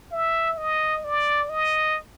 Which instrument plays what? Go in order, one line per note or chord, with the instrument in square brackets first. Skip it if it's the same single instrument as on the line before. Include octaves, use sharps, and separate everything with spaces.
[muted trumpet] E5
D#5
D5
D#5